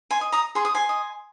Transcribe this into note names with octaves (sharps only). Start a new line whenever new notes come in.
G#5 C6
D#5
A#5 D#6
G#4 C6
D#6
G#5 C6
D#5